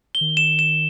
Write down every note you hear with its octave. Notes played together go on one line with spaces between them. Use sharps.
G7
D#3
E7
E7